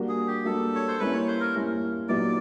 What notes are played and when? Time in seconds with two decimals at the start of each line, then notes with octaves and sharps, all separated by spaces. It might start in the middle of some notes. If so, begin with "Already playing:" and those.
Already playing: G3 A#3 D4 F#4
0.09 G#4
0.27 G4
0.45 G3 A#3 D4 F#4 A4
0.75 C#5
0.88 C5
0.99 G3 A#3 C#4 E4 B4
1.13 C#5
1.27 C5
1.40 A#4
1.55 G3 A#3 C#4 E4
2.09 A#2 F#3 B3 D#4 G4 D5